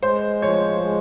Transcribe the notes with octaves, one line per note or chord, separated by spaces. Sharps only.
G#3 C5
F3 C#5
G#3